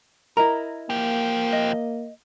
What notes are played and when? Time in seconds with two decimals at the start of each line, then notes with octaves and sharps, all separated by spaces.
0.37 E4 A#4 D#5 A#5
0.90 F3 A#3 G4
1.52 D#5